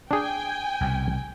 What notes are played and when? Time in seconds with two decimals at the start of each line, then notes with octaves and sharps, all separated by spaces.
0.11 D4 G#4 G5 G#5
0.81 C2 B2